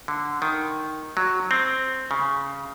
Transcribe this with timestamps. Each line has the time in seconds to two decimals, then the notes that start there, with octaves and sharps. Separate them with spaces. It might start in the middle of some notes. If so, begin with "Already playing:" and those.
0.08 D3
0.42 D#3
1.17 F#3
1.51 C4
2.11 C#3